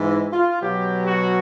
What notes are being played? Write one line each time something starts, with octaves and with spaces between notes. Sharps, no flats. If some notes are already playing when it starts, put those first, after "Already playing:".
Already playing: G#2 E3
F4
B2 F#3 G4
F#4